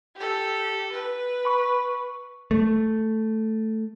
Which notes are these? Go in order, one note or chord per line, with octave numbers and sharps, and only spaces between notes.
G4 A4
B4
B5 C#6
A3